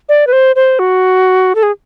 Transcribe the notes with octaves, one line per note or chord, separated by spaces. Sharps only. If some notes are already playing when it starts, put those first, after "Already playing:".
D5
B4
C5
C5
F#4
A4
G#4